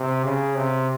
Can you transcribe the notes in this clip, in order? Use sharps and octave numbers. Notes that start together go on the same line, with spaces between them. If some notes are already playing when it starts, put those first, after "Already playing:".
Already playing: C3
C#3
C3